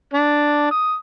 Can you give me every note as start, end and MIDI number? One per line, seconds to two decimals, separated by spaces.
0.14 0.71 62
0.71 0.95 87